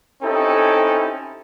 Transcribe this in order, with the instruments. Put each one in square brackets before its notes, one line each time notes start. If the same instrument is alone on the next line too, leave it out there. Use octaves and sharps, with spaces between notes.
[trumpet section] C4 C#4 D#4 E4 G4 A4